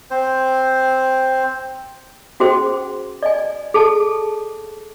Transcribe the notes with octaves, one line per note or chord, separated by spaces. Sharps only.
C4 C5
C#4 F#4 G#4 C5 G5
D5 D#5 G#5
G#4 A4 A5